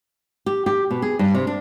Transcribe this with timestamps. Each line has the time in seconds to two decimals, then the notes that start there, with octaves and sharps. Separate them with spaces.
0.46 G4
0.66 G4
0.91 B2
1.02 G#4
1.19 G2
1.34 C3
1.47 D4